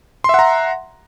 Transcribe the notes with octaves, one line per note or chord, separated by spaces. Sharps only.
E5 F#5 A#5 C6